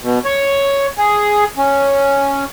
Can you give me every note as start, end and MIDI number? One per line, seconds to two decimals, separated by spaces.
0.02 0.19 47
0.25 0.86 73
0.98 1.44 68
1.57 2.45 61